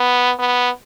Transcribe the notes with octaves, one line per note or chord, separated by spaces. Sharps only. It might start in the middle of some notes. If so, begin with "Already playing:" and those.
Already playing: B3
B3